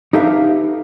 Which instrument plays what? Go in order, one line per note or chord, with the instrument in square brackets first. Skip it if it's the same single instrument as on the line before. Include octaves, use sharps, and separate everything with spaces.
[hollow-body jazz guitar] D#4 G4 A4 B4 E5 F5